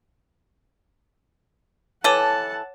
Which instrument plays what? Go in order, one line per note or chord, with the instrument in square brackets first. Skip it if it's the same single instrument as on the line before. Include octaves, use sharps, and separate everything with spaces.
[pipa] E3 A4 [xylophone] C#5 D6 D#7 [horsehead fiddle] F#5 A5